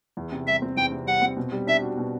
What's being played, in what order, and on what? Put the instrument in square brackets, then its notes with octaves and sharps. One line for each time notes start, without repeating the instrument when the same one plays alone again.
[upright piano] E2
C3
[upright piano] G3 [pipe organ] E5
[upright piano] C4
[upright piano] E2 [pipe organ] G5
[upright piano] C3
[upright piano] G3 [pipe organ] F#5
[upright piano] C4
B2
G3
[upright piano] D4 [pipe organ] E5
[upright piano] F#4
B2